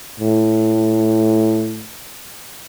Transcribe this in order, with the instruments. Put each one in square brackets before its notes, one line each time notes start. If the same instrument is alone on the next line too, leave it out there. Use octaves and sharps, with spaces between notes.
[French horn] A2